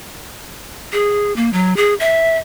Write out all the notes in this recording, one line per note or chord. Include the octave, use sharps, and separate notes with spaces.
G#4
A#3
F#3
G#4
E5